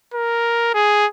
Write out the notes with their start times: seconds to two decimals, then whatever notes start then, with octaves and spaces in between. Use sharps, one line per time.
0.14 A#4
0.74 G#4